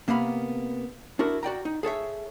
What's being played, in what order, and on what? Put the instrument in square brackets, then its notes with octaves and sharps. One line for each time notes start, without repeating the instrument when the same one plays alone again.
[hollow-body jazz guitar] C3 A#3 B3 F5 B5
D4 E4 F#4 A#4
F#4 D5 G5 A#5
D#4
G#4 A4 C#5 E5